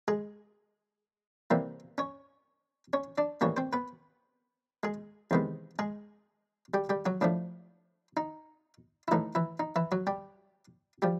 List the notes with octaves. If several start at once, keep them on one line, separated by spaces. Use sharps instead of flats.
G#3 G#4
C3 E3 G3 A#3
C#4 C#5
C#4 C#5
D4 D5
A2 E3 G3 A#3 C#4 C#5
C4 C5
B3 B4
G#3 G#4
E2 C3 D#3 G#3 B3
G#3 G#4
G3 G4
G3 G4
F#3 F#4
A2 F3 A3 D4
D#4
E4
A2 E3 A3 D#4
E3 E4
D#4
E3 E4
F#3 F#4
G3 G4
F3 G3 G4